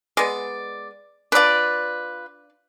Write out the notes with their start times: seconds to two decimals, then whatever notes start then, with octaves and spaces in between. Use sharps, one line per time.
0.17 G#3 B3 D5
1.32 D4 F4 B4 D5